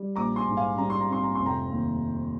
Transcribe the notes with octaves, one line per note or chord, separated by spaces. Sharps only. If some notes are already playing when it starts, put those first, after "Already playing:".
Already playing: G3
A#1 A#5 D6
G#5 C6
G#2
F5 G#5
G3 A#5
C6
A#5
C4 C6
A#5
F1 C6
G5 A#5
D#2